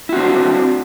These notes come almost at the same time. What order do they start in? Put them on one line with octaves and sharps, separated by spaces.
E4 F#4 C4 D4